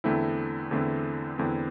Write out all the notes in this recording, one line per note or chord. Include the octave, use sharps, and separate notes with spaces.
E2 D3 A3 C4 E4
E2 D3 A3 C4 E4
E2 D3 A3 C4 E4